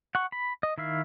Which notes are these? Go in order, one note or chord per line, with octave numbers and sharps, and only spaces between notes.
F#5 C#6
B5
D#5
D#3 E4 E5 F5